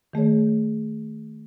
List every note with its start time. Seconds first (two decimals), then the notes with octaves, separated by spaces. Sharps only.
0.13 D#3 A3 G#4 C#5